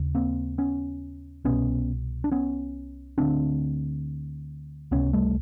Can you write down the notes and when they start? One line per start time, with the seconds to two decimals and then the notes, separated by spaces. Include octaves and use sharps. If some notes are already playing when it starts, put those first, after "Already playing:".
Already playing: D#2 C#3
0.15 A#3 C4
0.58 B3 C#4
1.45 C2 B2 B3 C#4
2.24 D4
2.31 B3 C#4
3.18 D2 D3 C4 D4
4.91 C#2 C3 B3 C#4
5.13 G3 A3